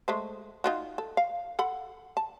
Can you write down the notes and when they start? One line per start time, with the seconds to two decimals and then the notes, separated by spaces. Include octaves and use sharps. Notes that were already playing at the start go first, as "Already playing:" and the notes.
0.08 G#3 A3 C5
0.64 D#4 F4 F#4
0.98 A4
1.17 F5
1.59 A4 F#5 B5
2.17 A5